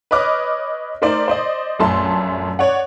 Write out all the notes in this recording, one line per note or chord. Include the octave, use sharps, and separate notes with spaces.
B4 C#5 D#5 D6 F6
A3 D#4 A#4 C5 D5
C5 D5 D#5
A#1 F#2 A3 A5 C6
C#5 D5 F#5